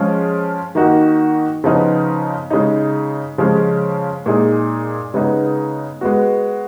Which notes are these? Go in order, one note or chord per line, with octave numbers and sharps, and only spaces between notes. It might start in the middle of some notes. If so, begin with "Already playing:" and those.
Already playing: F3 G#3 C#4 F4 G#4
D#3 A#3 D#4 F#4
C#3 F3 B3 D#4
C#3 G#3 D#4
C#3 F3 G#3 C#4
A#2 G#3 D#4 G#4
C#3 G#3 B3 D#4
G#3 B3 F#4